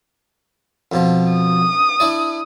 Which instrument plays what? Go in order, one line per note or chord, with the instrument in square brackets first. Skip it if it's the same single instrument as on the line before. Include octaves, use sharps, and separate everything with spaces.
[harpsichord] F2 B2 F3
[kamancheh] D#6
[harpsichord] D4 E4 D5